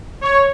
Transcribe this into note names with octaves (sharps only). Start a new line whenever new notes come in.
C#5